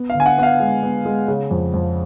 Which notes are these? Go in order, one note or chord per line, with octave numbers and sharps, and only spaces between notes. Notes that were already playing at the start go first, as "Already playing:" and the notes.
Already playing: B3
F5
D3
G#5
F#5
B3 F5 F#5
G#3
B3
G#3
C#3
F2
F2